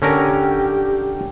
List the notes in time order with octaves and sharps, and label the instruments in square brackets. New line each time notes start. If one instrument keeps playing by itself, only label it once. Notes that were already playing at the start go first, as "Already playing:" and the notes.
[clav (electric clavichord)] D3 C#4 A#4 [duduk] G4